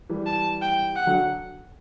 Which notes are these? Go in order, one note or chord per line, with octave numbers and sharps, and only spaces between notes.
E3 G3
A5
G5
F#5
D3 F#3